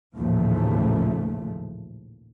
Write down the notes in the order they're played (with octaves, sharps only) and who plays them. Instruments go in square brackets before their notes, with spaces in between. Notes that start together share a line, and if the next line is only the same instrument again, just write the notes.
[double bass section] A1 D#2 A#2 C#3 F3 A3